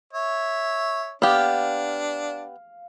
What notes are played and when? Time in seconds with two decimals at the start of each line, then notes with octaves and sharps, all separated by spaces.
0.13 C#5 E5
1.22 B3 D4 G4 F5